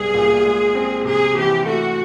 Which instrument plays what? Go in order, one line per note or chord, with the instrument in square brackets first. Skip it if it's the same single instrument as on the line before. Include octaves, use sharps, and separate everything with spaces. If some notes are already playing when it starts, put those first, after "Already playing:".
Already playing: [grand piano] C2 G3 B3 [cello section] G#4
[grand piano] A#2
G#3
C4
[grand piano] C3 [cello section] G#4
[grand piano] E3 [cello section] G4
[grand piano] A3 [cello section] F#4